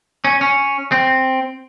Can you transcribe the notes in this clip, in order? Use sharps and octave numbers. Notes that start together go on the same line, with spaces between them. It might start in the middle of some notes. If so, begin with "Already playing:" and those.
C#4
C#4
C4